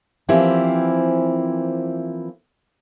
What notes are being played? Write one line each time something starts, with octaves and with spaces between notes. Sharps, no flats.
E3 F3 A#3 C4 E4 G4